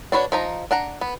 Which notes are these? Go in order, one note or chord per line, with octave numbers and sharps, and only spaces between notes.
D4 F#4 B4 C#5
F3 D#4 A#5
D4 F#5 A#5
B3